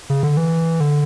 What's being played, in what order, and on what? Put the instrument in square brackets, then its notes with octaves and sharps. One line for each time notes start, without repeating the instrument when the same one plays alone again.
[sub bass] C#3
D3
E3
D3